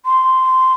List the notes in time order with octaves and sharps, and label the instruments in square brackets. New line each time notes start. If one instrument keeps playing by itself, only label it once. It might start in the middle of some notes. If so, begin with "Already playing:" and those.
[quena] C6